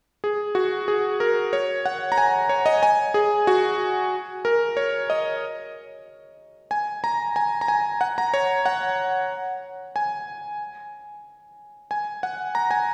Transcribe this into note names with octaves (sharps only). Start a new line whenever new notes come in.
G#4
F#4
G#4
A#4
C#5
F#5
A#5
G#5
C#5
D#5
G#5
G#4
F#4
A#4
C#5
D#5
G#5
A#5
G#5
A#5
G#5
F#5
A#5
C#5
F#5
G#5
G#5
F#5
A#5
G#5